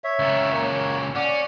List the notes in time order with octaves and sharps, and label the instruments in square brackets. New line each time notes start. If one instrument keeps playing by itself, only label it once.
[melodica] C#5 E5
[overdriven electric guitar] C#2 A#2
[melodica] A#3 C#5
[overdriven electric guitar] C#4 [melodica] D5 F#5 D6